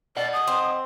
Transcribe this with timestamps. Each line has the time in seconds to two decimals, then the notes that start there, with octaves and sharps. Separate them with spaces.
0.17 D5 D#5 F#5
0.33 D#6
0.48 C4